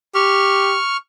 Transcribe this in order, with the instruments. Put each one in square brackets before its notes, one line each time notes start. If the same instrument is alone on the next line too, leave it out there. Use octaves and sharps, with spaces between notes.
[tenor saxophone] G4 [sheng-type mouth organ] C#6 F6